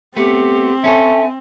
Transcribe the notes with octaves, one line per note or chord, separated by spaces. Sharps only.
A3 B3 C4 G4
C#4 A4 C#5 E5 G#5